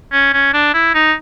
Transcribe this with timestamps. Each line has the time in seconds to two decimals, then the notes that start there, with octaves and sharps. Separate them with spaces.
0.12 C#4
0.33 C#4
0.54 D4
0.74 E4
0.95 D#4